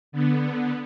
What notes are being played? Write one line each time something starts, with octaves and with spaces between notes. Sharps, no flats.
D3 B3